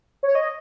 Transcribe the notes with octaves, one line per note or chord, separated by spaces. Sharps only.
C#5
D#5